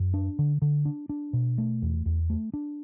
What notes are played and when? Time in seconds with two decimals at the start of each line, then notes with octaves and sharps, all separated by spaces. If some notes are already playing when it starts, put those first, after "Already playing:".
Already playing: F#2
0.14 D4
0.39 D3
0.62 D3
0.85 D4
1.09 D4
1.33 B2
1.58 A3
1.82 E2
2.06 E2
2.30 A3
2.54 D4